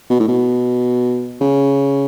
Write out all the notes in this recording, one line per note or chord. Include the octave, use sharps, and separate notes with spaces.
B2
A2
B2
C#3